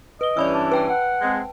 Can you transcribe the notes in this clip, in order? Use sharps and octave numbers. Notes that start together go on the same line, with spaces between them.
B4 D#5 G7
G2 E3 C#4 D5 B5 E6
D4
B4 G5 A5
F#5
G#3 C4